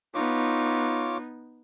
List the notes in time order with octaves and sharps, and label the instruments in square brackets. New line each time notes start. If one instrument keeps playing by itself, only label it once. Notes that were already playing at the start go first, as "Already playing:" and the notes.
[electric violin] B3 D#4 [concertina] F4 C#5 D6